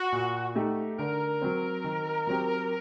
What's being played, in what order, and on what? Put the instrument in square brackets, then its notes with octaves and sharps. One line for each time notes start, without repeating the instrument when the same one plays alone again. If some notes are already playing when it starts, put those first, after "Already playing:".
Already playing: [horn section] F#4
[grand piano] A#2
A3 D#4 G4
[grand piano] D3 [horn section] A#4
[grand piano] F#3 C4
D#3
F#3 C4 G4